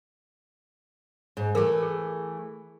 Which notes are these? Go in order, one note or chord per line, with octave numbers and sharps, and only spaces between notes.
G#2
E3 A3 G#4 A#4
G#4